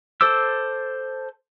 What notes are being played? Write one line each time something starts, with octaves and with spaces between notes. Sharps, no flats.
A4 C5 D6 E6